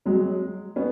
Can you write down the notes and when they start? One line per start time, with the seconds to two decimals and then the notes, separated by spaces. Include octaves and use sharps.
0.05 F#3 G#3
0.76 B3 C#4